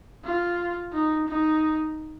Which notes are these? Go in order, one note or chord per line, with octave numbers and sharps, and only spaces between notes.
F4
D#4
D#4